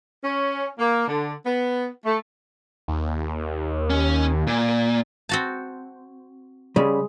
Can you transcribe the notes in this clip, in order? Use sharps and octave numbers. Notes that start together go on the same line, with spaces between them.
C#4
A#3
D3
B3
A3
D#2
C#4
A#2
C4 F#4 A5
C#3 G3 G#3